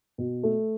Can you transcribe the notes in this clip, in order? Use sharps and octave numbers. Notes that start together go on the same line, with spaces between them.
B2
A3